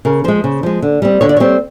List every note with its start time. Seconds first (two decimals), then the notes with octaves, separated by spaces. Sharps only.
0.05 C#3 A#4
0.24 F3 G#3 C5
0.44 C#3
0.63 F3 G#3
0.82 D3
1.02 G3 C4
1.21 D3 C#5
1.29 D5
1.37 G3 C4 C#5